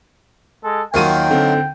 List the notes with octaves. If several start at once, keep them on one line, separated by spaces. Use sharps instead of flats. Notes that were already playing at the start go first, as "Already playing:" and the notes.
G#3 A4
D#2 D#3 F3 F#3 A#3 G5 D#7
D3 C4